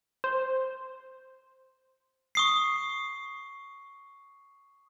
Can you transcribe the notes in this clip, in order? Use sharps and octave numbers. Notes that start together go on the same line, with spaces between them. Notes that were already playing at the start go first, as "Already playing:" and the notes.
C5
C#6 D#6 C7